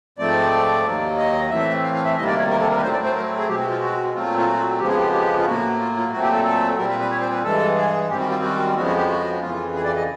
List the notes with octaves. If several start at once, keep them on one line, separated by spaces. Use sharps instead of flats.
G#2 F3 A3 C4 D5
D#2 D#3 F#3 A#3
D#5
A2 E3 A3 C4 E5
F5
F5
E5
D2 C3 D#3 G3 A#3 D#5
D5
C#5
A#4
A4
A#4
B4
A2 F#3 A3 C4 C5
D5
C5
A#4
G#4
B2 G#3 C4 G4
F#4
F4
F#4
A#2 F#3 A3 C4 F4
F4
F#4
F2 C#3 F3 G#3 B3 G4
G#4
G4
G4
F4
A2 F#3 A#3 F#4
F4
F4
A#2 F#3 A3 C4 F#4
G4
A4
A4
A#2 G3 C4 A#4
B4
B4
C#5
C5
B4
G2 E3 G#3 A4
G#4
F#2 D#3 G3 C4 G4
F#4
F4
F#4
F2 C#3 F3 G#3 B3 F#4
F#4
G4
F#4
F2 C#3 E3 F4
G#4
D5
D#5